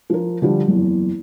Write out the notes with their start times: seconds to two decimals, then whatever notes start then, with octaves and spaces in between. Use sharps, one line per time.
0.10 F3 A#4
0.42 D3 F3 G3
0.68 F#1 E2